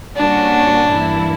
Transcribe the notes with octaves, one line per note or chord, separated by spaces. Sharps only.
A#2 G3 A#3 C#4 D4 F#4
G2 E3 A#3 E4